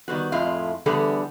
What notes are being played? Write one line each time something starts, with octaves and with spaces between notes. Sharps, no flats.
D#3 G3 B3 F#4
F2 A2 G#3 E4 F4
D3 E3 G3 B3 G#4 A4